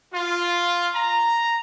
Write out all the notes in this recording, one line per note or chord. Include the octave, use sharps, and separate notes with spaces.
F4
A#5